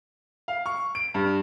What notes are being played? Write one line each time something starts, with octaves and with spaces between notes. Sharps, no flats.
F5
C#6
D7
G2